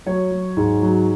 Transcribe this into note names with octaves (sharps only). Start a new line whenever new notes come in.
F#3 C#5
F#3
G#2
F#3